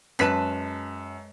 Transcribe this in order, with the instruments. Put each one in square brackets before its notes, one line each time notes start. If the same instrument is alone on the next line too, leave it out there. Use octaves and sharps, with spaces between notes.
[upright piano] F#2 B6 E7 [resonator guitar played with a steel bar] G#3 B4 A5